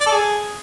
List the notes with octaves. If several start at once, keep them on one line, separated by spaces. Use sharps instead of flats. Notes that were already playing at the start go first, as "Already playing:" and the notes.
D5
A4
G#4